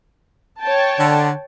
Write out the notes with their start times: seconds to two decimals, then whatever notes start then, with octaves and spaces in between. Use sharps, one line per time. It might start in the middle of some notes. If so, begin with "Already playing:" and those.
0.62 C#5 G5 A5
0.98 D3